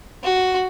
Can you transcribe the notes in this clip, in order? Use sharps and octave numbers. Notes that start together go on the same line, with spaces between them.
F#4